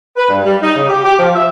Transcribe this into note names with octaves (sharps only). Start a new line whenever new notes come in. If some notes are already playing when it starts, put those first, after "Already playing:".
B4
G2
G3
D#4
C#3
G4
G4
F3
E5